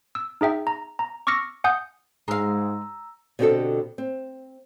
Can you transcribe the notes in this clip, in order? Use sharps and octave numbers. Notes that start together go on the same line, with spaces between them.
E6
D#4 G#4 E5 G5
A#5
A#5
C#6 D6 E6 F6 A#6 C#7
F#5 G#5 D#6 G6
G#2 G#3 F5 A#5 E6
B2 D3 C4 C#4 G4 A4
C4